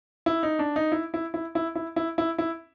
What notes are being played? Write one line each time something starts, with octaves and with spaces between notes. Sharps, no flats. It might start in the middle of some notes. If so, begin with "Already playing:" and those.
E4
D#4
D4
D#4
E4
E4
E4
E4
E4
E4
E4
E4